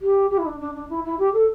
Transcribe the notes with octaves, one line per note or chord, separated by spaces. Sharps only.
G4
G4
E4
D4
D4
D4
E4
E4
G4
A4